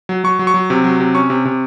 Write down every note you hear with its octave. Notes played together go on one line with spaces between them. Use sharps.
F#3
F#3 C#6
F#3
C#6
F#3
C3
F#3
C3
C#4 C#6
C3
C3